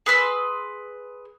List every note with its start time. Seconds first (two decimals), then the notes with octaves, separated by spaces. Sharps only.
0.06 G#4 B4 C6 E6